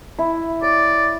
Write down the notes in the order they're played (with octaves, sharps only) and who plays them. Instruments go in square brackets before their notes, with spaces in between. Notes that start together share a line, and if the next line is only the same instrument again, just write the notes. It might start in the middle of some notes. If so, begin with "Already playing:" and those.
[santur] E4
[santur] C#5 [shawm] D5